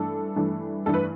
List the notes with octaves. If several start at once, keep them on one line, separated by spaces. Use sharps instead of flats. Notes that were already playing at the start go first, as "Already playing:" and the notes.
Already playing: G2 E3 A3 D4 A4
G2 E3 A3 D4
G2 E3 A3 D4 A4
B4